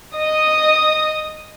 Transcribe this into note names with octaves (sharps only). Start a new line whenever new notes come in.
D#5 D#6